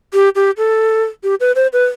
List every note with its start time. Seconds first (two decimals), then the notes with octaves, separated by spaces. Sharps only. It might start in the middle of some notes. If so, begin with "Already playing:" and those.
0.14 G4
0.35 G4
0.57 A4
1.23 G4
1.40 B4
1.56 C5
1.73 B4